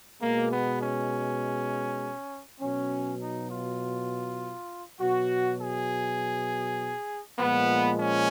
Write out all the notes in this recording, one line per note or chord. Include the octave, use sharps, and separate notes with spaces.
B2 G#3 A#3
B3
C#4
B2 F#3 C#4
D#4
F4
B2 F#3 F#4
G#4
A#2 F3 G#3 B3
C#4